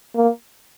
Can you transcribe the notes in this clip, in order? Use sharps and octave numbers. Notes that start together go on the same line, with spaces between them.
A#3